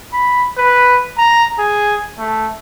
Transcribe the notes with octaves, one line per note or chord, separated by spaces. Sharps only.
B5
B4
A#5
G#4
A3